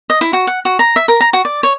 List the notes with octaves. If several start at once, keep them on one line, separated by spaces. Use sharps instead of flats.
D#5
E4
F#4
F#5
F#4
A#5
E5
A#4
A#5
F#4
D5
C#5